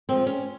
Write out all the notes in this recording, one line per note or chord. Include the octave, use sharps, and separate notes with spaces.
F3 G#3 C4
C#4